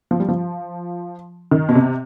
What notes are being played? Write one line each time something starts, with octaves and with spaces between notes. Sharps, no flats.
F3
G3
F3
D#3
B2
C3